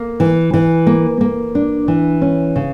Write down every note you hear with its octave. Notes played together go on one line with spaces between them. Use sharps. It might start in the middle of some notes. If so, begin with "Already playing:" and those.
Already playing: A#3
E3
E3
A#3
A#3
D4
E3
C#4
C#3